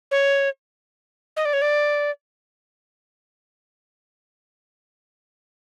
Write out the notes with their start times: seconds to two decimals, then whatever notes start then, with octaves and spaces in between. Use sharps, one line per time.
0.11 C#5
1.37 D#5
1.45 D5
1.53 C#5
1.62 D5